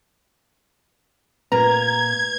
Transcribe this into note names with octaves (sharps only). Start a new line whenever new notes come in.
A#2 B4 A#5 G#6